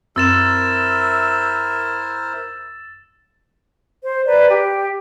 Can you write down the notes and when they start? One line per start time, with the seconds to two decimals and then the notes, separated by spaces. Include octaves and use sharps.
0.16 F#2 C4 E4 A#4 C5 E6 A6 E7
4.03 C5
4.26 B4 D5 A#5
4.49 G4